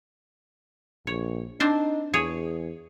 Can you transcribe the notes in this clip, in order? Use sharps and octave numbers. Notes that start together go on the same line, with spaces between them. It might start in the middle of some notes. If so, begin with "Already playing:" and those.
A#1 C#5
C4 D4 D#4 C5
E2 G#4 C#5